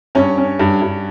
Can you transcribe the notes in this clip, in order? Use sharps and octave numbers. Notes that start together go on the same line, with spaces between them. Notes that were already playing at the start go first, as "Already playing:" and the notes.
G2 C#4 C#5
C#4
G2
G2